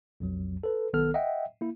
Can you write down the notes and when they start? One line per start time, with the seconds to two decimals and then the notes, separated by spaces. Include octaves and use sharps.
0.20 B1 F2 F#3
0.63 A4 B4
0.93 B1 D#3 B3 A4 F6
1.14 D#5 E5 F#5 G5
1.61 A#3 E4